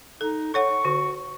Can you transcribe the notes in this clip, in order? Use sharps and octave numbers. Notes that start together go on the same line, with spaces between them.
D#4 A4
A4 C#5 F#5 C#6
D3 F#4